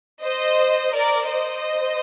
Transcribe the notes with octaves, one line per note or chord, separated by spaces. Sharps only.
C5 D#5
A#4 D5
C5 D#5